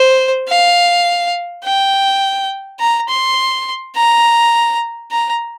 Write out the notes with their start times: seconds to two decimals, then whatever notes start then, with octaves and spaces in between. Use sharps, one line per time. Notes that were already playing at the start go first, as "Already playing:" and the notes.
Already playing: C5
0.48 F5
1.64 G5
2.79 A#5
3.09 C6
3.96 A#5
5.11 A#5